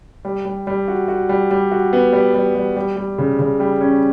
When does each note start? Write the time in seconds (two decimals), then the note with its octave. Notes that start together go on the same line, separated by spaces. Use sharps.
0.25 G3
0.45 G3
0.67 G3
0.88 F#4
1.08 F#4
1.29 G3
1.51 G3
1.72 F#4
1.93 B3
2.13 G3
2.34 G3
2.55 G3
2.76 G3
2.96 G3
3.18 C#3
3.39 C#3
3.60 G3
3.81 C#4